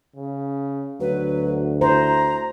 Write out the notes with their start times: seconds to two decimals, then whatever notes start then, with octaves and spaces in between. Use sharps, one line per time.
0.16 C#3
1.00 D2 F#3 B4
1.81 E4 C5 A#5